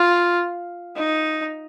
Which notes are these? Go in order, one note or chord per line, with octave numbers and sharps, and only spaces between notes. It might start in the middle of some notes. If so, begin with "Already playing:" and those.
Already playing: F4
D#4